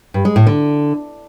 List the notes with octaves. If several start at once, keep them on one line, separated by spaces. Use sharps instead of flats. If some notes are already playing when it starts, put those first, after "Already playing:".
G2
G#3
A2
D3